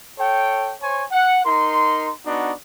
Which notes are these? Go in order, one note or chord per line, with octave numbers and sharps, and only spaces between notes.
A4 C#5 G5
C5 C#5 G#5 C#6
F#5
D#4 A#4 C6
B3 D4 D#4 F#4